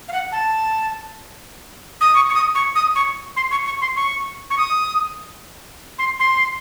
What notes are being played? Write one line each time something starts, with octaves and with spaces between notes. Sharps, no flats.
F5
F#5
A5
D#6
C#6
C#6
D#6
C#6
D#6
C#6
C6
C#6
C#6
C6
C#6
C#6
D#6
C6
C6